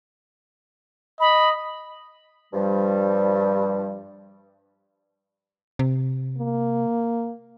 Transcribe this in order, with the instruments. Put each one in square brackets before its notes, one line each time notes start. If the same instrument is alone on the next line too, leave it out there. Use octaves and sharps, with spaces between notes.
[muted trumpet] D#5 [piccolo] B5
[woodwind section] G2 F3 G3
[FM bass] C3
[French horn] A#3